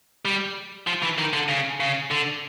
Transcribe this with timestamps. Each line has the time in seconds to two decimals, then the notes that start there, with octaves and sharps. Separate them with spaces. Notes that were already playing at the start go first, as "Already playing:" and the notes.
0.25 G3
0.87 F3
1.02 E3
1.18 D#3
1.33 D3
1.49 C#3
1.80 C#3
2.11 D3